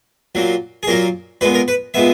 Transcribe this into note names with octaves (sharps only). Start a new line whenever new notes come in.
A#2 F#3 A#3
G#4
A#2 F#3 A#3 A#4
A#2 G#3 B3 B4
A#4
B4
A#2 G#3 B3 E5